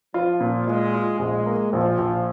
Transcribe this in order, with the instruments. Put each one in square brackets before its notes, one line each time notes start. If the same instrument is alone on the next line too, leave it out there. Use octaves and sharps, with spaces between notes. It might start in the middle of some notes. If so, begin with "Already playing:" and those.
[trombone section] F3 [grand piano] F4
[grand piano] A#2
[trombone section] G#3 [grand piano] F4
[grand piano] F4
[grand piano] A#1 [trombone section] G#3
[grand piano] A#3
[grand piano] A#1 [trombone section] F3
[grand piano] A#1